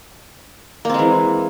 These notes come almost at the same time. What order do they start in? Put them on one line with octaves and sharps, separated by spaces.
A#3 C4 G#3 E3